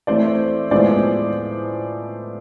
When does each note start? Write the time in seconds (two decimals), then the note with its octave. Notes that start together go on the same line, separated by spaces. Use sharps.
0.07 E3 A3 C4 C5 D5
0.71 A2 F3 G#3 B3 C5 D5